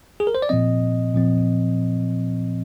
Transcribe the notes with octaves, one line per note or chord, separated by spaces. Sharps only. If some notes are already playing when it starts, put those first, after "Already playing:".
G#4
A#4
C5
D5
A#2 F3 C4 D#5
A#2 F3 C4